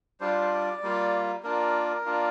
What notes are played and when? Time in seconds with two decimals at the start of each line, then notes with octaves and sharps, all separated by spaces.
0.20 G3 D4 F4 C5
0.41 C5
0.51 D5
0.83 G3 A#3 F4
1.43 A#3 D4 F4 A#4
2.06 A#3 D4 F4